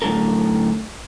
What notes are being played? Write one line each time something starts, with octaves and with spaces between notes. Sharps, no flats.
F#2 A2 D3 F#3 A4 A#4